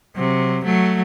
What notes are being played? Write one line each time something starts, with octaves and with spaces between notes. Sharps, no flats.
C3 F#3
F#3 A3